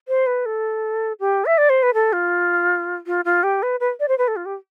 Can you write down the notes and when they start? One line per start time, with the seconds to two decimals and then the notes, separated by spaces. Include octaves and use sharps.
0.08 C5
0.27 B4
0.46 A4
1.20 G4
1.46 E5
1.58 D5
1.70 C5
1.83 B4
1.94 A4
2.13 F4
3.07 F4
3.25 F4
3.43 G4
3.63 B4
3.80 B4
4.00 D5
4.08 C5
4.18 B4
4.28 A4
4.36 F4
4.46 G4